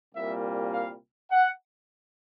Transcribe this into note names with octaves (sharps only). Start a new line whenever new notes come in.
C2 A#2 G3 A#3 E5
F5
F#5